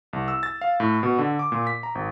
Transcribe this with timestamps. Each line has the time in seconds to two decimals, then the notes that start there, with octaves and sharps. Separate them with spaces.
0.13 C2
0.28 E6
0.43 A6
0.61 F5
0.80 A2
1.03 B2
1.18 D3
1.39 D6
1.52 A#2
1.67 B6
1.83 A#5
1.95 G#1